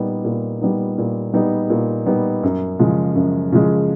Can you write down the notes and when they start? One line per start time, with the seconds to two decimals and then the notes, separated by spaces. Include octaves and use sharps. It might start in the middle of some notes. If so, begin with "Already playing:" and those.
Already playing: A#2 G3 B3 D#4
0.24 A#2
0.61 G3 B3 D#4
0.98 A#2
1.34 G3 B3 D#4
1.70 A#2
2.06 G3 B3 D#4
2.43 F#2
2.80 C#3 F3 G#3
3.15 F#2
3.52 C#3 F3 G#3